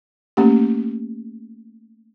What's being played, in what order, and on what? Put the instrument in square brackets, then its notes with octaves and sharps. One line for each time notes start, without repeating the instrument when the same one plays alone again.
[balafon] A3 A#3 C#4 G4